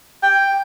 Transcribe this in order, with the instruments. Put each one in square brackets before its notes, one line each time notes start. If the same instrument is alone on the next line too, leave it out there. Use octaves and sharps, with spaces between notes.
[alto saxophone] G5